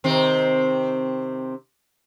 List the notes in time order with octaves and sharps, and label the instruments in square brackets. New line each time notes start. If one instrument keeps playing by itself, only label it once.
[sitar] C3 D#3 C4